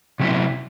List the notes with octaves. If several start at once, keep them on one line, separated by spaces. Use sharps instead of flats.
C3 F#3 C#4 E4